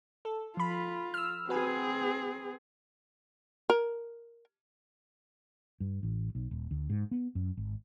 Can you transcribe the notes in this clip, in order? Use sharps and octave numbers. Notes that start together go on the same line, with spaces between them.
A4
F3 F4 B5
E6 F6
C4 F#4 G#4 B4 G#5
A#4
G2
A1
B1
D#1
D2
G#2
B3
F#2
G#1